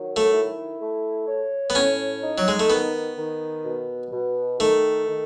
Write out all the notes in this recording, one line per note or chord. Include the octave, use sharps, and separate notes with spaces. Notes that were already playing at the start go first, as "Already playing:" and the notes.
Already playing: D#3 F#3
A3
E4
A3
C#5
B3
A2 C#4
D#4
F#3
G#3
A3
D#3 B3
D#3
B2
B2
D#3 A3
D#3